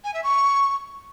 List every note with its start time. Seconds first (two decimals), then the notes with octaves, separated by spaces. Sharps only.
0.04 G#5
0.14 E5
0.24 C#6